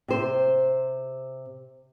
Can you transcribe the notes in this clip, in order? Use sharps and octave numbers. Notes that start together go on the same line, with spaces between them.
C3 C5